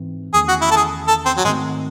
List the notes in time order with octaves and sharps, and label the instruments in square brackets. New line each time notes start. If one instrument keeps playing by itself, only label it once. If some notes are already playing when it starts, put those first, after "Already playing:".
Already playing: [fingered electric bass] G#2 E3 C4
[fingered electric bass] E2 D#3 A3 C#4 [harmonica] G#4
[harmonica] F#4
E4
A4
G#4
A4
C4
F#3
[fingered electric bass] G#2 D#3 A3 C4 [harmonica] G#3